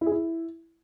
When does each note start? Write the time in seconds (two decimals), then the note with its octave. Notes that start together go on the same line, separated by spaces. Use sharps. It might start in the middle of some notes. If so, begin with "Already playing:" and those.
0.01 E4
0.06 G#4
0.11 E4